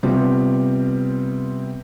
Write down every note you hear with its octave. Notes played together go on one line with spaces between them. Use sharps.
C3 G3 B3 C4 F4